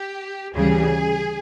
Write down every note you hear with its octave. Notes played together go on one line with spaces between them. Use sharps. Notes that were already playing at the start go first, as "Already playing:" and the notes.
Already playing: G4
D2 C#3 E3 G3 G#4